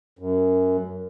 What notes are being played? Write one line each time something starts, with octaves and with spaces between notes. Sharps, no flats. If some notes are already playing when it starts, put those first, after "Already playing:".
F#2